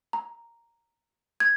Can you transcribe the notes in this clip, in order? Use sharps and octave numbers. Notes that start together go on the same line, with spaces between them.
A#5
G#6